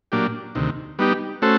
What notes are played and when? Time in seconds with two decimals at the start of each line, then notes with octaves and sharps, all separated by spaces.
0.12 A#2 F#3 A#3 D4 G4
0.55 D2 C3 D#3
0.99 G3 B3 D#4 G4
1.42 A3 C#4 F#4 A4 C5